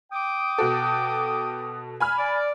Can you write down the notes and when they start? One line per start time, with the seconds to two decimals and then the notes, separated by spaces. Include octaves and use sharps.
0.12 G5 D6 D#6
0.58 B2 F#4 A4
2.00 G#5 B5 F6
2.18 D5